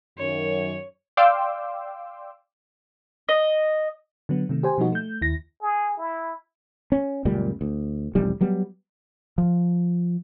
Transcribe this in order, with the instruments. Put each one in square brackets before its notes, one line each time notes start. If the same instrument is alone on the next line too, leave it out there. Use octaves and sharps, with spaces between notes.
[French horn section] F#2 D#3 [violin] C#5
[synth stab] D5 F5 G5 C6 D6 E6
[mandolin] D#5
[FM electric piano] D3 F#3 B3
C3 D#3 A3
G4 C5 G#5
B2 F3 G3 A#3 D#4 F#4
A3 G6
D#2 E4 A#6
[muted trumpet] G#4
E4
[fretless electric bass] C#4
C#2 F#2 A#2 G3
D2
E1 B1 F2 G3
F#3 G3 B3
[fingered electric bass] F3